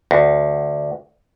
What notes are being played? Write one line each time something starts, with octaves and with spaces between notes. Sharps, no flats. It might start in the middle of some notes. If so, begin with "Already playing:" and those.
D2